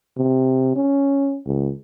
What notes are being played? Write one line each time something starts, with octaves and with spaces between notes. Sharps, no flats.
C3
C#4
C#2